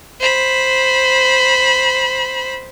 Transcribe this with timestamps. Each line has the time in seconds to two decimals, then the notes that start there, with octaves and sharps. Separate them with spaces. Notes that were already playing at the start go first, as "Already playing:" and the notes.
0.20 C5 B5